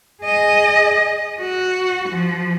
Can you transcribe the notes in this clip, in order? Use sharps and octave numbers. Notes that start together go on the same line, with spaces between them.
G#4 D#5
F#4
F3